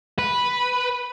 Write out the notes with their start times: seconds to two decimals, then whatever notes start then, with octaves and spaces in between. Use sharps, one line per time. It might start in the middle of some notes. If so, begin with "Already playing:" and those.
0.19 B4